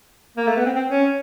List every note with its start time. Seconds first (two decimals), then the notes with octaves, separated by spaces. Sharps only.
0.37 A#3
0.47 A3
0.57 B3
0.65 C4
0.76 C4
0.90 C#4